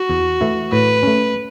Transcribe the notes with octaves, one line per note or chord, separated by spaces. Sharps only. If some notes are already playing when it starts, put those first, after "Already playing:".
Already playing: F#4
E2
E3 A3 E4
A2 B4
A3 C#4